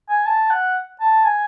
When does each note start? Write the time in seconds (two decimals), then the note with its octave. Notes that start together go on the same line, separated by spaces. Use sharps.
0.09 G#5
0.26 A5
0.50 F#5
1.01 A5
1.25 G#5